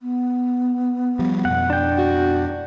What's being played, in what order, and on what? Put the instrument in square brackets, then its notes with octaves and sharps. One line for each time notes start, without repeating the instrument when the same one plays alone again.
[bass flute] B3
[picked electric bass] F3 G3
[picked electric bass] F2 B2 [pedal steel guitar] F#5
[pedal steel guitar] D4 G5
[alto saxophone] F#4